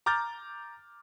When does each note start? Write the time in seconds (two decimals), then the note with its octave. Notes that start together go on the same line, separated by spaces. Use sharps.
0.06 A#5 D6 F6 G6 A6